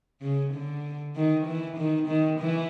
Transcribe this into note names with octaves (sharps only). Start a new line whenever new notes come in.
C#3
D3
D#3
E3
D#3
D#3
E3